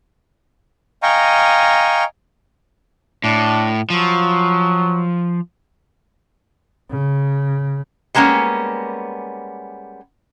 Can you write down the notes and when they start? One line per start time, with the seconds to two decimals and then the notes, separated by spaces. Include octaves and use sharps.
1.03 D#5 F5 G5 G#5 A#5 C#6
3.24 A2 D4
3.90 F3 F#3
6.91 C#3
8.15 G3 G#3 A#3 B3 C#4